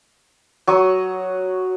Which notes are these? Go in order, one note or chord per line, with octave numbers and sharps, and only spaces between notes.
F#3 C#6 D#6